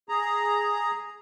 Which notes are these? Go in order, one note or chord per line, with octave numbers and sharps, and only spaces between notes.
G#4 A#5